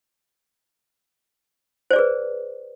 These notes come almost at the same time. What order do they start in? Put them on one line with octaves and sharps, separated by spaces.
C5 D5 G#4 B4